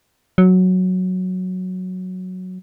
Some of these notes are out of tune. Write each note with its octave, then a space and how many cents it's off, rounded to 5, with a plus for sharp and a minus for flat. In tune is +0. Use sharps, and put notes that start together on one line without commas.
F#3 -5